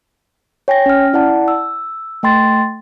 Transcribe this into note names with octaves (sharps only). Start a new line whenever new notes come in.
C#5 G5 G#5 A#6
C#4 F6
E4 D5 F#5 A5
E6
A3 G5 C6 A6